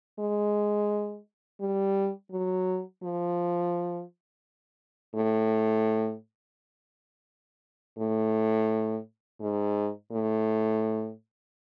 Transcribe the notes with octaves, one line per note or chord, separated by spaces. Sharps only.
G#3
G3
F#3
F3
A2
A2
G#2
A2